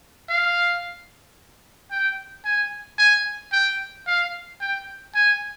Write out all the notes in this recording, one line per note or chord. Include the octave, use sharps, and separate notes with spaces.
F5
G5
G#5
G#5
G5
F5
G5
G#5